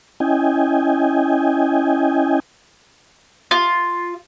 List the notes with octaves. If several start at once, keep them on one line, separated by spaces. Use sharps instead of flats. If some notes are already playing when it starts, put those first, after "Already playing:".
C#4 E4 D#5 G5 G#5
F4